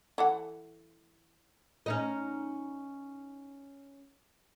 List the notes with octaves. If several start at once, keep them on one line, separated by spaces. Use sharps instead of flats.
E3 A4 F#5
C#4 D#4 D#5